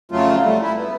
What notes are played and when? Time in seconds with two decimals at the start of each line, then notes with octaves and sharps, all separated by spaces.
0.12 F2 C#3 F#3 A3 F4
0.43 G3 A3
0.61 E4
0.77 B3